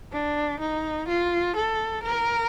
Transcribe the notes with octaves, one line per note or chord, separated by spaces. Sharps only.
D4
D#4
F4
A4
A#4